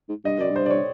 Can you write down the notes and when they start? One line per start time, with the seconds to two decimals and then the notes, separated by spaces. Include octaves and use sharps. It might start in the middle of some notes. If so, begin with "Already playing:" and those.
0.09 G#2
0.24 G2 D#5
0.38 F#2 D5
0.50 G2
0.56 C5
0.66 D5
0.71 C#5